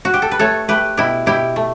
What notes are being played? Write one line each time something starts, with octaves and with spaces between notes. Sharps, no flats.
F#4
G4
A4
B4
A3 A4 C#5
A3 G4 B4
B2 E4 G4
B2 E4 G4
A3